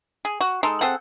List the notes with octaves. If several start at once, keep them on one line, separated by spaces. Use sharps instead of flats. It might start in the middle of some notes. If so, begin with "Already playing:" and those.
G#4
F#4
G#3 D#4 A4
C4 G#4 A4 F#5